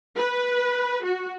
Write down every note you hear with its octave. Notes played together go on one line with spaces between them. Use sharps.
B4
F#4